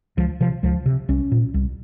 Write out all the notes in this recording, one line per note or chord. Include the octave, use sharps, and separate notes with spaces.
C#2 F3
C3 F3
C#2 F3
C3
C2 C#4
A#2
C2